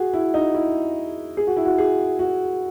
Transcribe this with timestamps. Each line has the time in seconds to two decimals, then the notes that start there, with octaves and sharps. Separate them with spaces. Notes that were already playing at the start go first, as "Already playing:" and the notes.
Already playing: F#4 G#4
0.13 E4
0.34 D#4
0.55 E4
1.37 G#4
1.47 F#4
1.57 E4
1.65 F#4
1.78 G#4
2.19 F#4